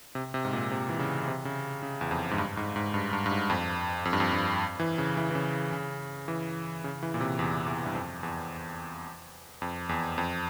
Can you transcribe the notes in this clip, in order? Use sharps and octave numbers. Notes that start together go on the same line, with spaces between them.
C3
C3
G#2
A#2
C3
E3
C#3
C3
C#3
C#3
E2
F2
G#2
G2
G#2
G#2
G2
G2
G2
G#2
F2
F2
G2
F2
G2
E3
C#3
E3
E3
C#3
C#3
E3
C#3
E3
A#2
C3
E2
E2
G2
F2
E2
F2
E2
F2